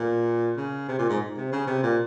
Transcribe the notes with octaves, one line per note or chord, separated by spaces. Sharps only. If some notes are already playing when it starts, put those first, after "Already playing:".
Already playing: A#2
C#3
C3
A#2
G#2
C3
C#3
C3
A#2